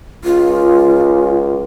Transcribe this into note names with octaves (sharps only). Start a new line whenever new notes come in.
C#2 F4